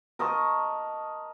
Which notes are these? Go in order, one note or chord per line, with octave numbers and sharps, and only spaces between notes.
A#4 D#5 A5 C#6